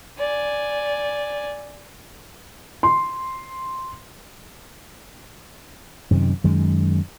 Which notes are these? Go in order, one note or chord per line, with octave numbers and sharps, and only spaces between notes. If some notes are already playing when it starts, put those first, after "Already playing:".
D5 G#5
C6
F#2 C3 D#3
F#2 D#3 G#3